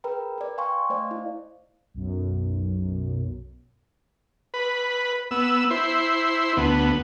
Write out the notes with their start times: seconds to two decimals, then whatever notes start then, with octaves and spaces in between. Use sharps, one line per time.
0.04 G#4 A#4 B4 G5 A#5 B5
0.38 B4 D5
0.58 F5 G5 G#5 C6 C#6
0.90 A3 C5 D5 D#5 F5
1.11 E4
1.94 B1 F#2
4.54 B4
5.31 B3 E6
5.71 E4 C5
6.57 D2 B3